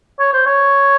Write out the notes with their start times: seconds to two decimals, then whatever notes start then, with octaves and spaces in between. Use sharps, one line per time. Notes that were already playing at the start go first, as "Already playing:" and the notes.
0.19 C#5
0.33 C5
0.47 C#5